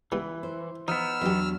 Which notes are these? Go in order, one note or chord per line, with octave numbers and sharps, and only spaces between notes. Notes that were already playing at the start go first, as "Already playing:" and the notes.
C#2 E3 G3 B3
C5
F3 B3 D#4 E6 F6
E2 B2 F#3 D4 G4